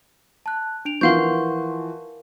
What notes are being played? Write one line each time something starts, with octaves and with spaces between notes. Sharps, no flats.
A5 F#6
D4 D7 F7
E3 F3 A#4 F5 F#5 C6 C#6 G6